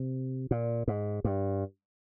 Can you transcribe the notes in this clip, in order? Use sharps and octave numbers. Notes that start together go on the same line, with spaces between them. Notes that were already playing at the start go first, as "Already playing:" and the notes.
Already playing: C3
A#2
G#2
G2